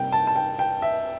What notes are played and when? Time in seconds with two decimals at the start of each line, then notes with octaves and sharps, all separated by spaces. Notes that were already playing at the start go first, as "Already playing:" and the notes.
Already playing: C3 G3 A#3 G5
0.12 A5
0.27 A5
0.36 G5
0.59 G5
0.82 E5